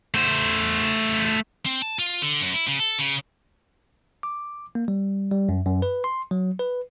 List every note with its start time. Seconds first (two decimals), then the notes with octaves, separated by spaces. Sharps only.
0.14 A3 C5
1.66 C4
1.82 A5
1.99 F4
2.22 D3
2.41 F#2
2.54 E4
2.67 C#3
2.79 A4
2.99 C#3
4.23 D6
4.75 A#3
4.88 G3
5.32 G3
5.49 F#2
5.66 F#2
5.82 B4
6.04 C6
6.31 F#3
6.59 B4